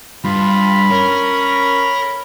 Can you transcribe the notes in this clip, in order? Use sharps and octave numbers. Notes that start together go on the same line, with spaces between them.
G2 F4 B5
C#4 A#4